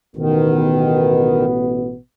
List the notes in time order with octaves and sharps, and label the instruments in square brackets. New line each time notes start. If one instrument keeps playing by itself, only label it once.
[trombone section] A1 B2 B3 [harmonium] D#3